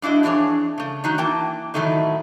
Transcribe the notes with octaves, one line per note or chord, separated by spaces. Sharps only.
G2 D4 E4 F#4 D#5
F2 E3 D4 G#4 C#5
C#3 A3
D#3 F#3 D#4 F#4
E3 A#3 G5 A5
A2 D#3 F#3 A3 C#4 D#4